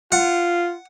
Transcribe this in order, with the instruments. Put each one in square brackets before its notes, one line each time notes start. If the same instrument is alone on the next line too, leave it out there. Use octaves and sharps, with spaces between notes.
[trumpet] F4 [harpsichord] F#5